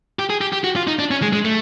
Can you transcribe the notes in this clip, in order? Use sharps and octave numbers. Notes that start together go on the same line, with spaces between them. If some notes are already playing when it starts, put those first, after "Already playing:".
G4
G#4
G4
G4
F#4
F4
D#4
D4
C#4
G#3
G#3
A3